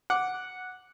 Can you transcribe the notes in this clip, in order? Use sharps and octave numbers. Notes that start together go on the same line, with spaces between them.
F#5 D6